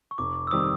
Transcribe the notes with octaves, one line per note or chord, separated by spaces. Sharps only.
C#6
F1 D6
E6
D#3 G3 C4 D#6